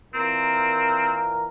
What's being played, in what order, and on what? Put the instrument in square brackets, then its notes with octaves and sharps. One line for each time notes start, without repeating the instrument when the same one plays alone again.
[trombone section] A#2 E3 A#4 [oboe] C4